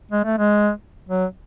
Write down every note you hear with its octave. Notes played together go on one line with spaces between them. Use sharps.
G#3
A3
G#3
F#3